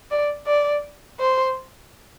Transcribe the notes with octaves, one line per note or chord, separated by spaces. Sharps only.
D5
D5
C5